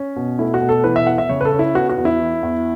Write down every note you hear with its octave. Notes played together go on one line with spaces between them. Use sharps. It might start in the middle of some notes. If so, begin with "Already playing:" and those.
Already playing: C#4
B2
A3 E4
F#4
B2
A4
E3 B4
E5
E2 F#5
E5
C#3 C#5
B4
A4
C#4
E4
B3 F#4
F#4
E2
E4
E3
E2